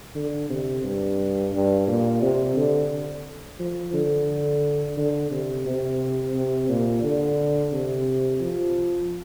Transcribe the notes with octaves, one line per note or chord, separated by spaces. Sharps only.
D3
C3
G2
G2
A#2
C3
D3
F3
D3
D3
C3
C3
C3
A#2
D3
C3
F3